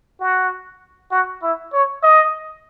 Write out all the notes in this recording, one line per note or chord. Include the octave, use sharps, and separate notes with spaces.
F#4
F#4
E4
C#5
D#5